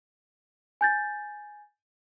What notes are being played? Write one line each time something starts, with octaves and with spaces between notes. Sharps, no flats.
G#5 G6 A6